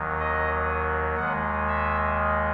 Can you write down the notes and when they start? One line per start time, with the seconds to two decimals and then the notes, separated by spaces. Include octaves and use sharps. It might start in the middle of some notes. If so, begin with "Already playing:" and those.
Already playing: D#2 D#3 F#3
0.20 D#5
1.17 D#2 D#3 G#3 F#5
1.67 E5